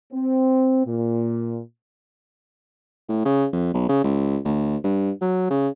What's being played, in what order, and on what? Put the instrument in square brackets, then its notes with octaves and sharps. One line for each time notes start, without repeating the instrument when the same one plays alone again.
[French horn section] C4
A#2
[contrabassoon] A2
C#3
F2
B1
C#3
C#2
D2
G2
F#3
C#3